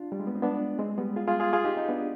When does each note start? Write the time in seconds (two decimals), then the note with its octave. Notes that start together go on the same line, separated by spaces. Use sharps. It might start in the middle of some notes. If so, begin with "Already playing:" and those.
Already playing: D4 F4
0.12 G3
0.20 G#3
0.27 B3
0.36 C4
0.42 B3 D4
0.79 G#3 C4
0.98 G3 B3
1.16 F4 G#4
1.28 F4 G#4
1.40 F4 G#4
1.53 F4 G#4
1.64 D#4 G4
1.77 C4 D#4
1.89 B3 D4